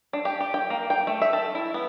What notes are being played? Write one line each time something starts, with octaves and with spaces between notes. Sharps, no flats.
D4
G4
G4
G5
A#3
G5
A3
E5
A4
E4
B3